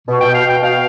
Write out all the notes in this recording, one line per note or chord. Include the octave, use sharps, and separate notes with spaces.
B2
B2 G5
F5
B2 G5
B2 F5